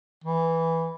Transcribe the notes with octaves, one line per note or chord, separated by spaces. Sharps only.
E3